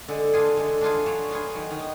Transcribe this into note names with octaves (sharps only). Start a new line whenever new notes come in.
D3 G#3
D4 F4 G#4
D3 G#3
D4 F4 G#4
F#3
B3 F4 G#4
D#3 F#3
D#3
B3